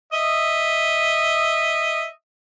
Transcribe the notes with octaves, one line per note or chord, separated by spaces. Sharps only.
D#5 E5